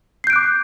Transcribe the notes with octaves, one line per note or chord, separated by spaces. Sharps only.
D6 F#6 G6 C7 D7